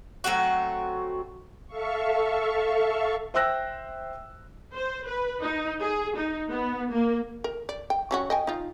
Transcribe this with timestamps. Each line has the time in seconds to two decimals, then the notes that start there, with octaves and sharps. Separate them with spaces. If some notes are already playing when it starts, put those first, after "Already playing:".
0.24 F#3 A3 C4 F#4
1.67 A4 E5 F5 C#6
3.34 C5 E5 G5 E6 F#6 A#6
4.74 C5
5.07 B4
5.42 D#4
5.82 G#4
6.17 D#4
6.49 B3
6.92 A#3
7.44 A#4
7.69 D5
7.90 G5
8.11 F#3 C#4 F#4
8.30 D#5 G5 G#5
8.47 D#4 F4